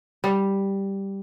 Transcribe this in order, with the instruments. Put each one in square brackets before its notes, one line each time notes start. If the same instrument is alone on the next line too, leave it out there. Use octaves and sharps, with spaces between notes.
[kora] G3